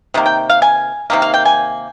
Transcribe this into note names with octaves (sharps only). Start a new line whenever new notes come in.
C3 D#3 A#3
G5
F5
G#5
C3 D#3 A#3
F5
G5
G#5